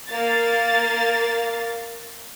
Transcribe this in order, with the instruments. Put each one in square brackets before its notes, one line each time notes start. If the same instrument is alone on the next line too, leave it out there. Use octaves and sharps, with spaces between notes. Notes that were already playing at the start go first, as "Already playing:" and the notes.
[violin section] A#3 F5 A6